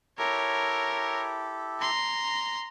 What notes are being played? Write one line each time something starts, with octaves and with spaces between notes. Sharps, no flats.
E4 G4 A4 A#4 C#5
A#5 C6